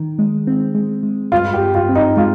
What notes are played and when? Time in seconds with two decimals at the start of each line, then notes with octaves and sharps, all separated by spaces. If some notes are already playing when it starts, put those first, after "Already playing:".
Already playing: D#3
0.19 G#3
0.47 C4
0.75 G#3
1.03 G#3
1.32 G2 F4
1.54 G4
1.60 G2
1.75 F4
1.89 C4
1.95 D#4
2.17 G#3 F4